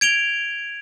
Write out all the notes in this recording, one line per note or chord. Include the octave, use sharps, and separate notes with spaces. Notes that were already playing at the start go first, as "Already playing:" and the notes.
G#6 D7 F7 G7